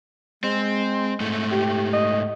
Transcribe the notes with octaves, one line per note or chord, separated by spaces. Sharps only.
G#3 C4
G#2 A3
G4
D#5